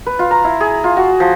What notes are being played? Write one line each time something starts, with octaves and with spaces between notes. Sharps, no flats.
B4
F4
A#5
E4
G#4
F4
F#4
F3